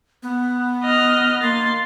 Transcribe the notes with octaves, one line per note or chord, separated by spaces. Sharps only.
B3
D#5 F6
A#3 C6 A6